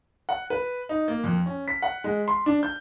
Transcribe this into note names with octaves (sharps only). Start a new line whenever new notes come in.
F#5
B4
D#4
A#3
F2
C#4
B6
F#5
G#3
C6
D4
G6